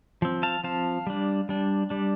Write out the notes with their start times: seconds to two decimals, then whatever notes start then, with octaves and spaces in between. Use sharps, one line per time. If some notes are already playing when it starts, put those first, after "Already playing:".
0.22 F3 C4
0.43 F5 A5
0.64 F3 C4 F5 A5
1.07 G3 D4
1.49 G3 D4
1.90 G3 D4